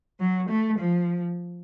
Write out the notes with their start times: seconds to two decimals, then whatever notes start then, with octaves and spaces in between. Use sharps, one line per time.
0.20 F#3
0.49 A3
0.79 F3